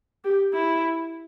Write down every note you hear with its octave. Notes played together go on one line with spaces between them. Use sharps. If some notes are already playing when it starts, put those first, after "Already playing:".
G4
E4